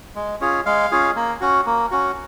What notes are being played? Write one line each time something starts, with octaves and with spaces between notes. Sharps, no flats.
G#3
C#4 F4 G#4
G#3 F5
C#4 F4 G#4
A#3
C#4 F#4
A#3
C#4 F#4